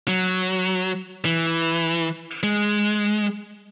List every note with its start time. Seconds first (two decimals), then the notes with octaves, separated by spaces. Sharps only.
0.08 F#3
1.25 E3
2.43 G#3